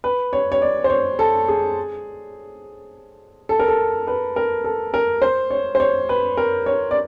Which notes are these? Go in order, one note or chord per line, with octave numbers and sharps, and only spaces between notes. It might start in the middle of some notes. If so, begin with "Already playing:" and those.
B4
C#5
C#5
D5
C5
C#5
A4
G#4
A4
A#4
A4
B4
A#4
A4
A#4
C5
C#5
C5
C#5
B4
A#4
C#5
D5